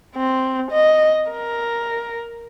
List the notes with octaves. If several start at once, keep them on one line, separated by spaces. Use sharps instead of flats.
C4
D#5
A#4